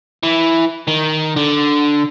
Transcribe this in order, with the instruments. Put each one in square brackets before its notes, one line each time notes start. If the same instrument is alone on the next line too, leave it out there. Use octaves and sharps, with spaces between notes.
[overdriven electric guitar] E3
D#3
D3